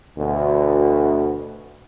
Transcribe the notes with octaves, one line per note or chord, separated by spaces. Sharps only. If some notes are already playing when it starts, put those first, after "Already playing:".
D2 B2